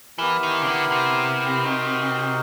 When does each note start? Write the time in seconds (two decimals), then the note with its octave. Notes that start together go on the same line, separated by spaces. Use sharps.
0.18 E3 B3 E4 G4 A#4
0.43 D#3
0.62 C#3
0.67 D3
0.92 C3
1.64 D#4 F#4 A#4